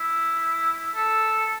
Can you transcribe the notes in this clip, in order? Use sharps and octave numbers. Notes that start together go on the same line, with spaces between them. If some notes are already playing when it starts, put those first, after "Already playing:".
Already playing: E4
A4